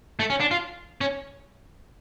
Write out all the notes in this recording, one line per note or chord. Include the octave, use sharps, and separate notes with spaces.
A3
C#4
D4
F4
C#4